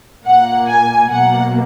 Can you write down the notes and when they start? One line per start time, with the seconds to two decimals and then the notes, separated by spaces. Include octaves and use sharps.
0.24 A#2 A#3 F#5
0.67 G#5
1.09 B2 F#3 A#3 F#5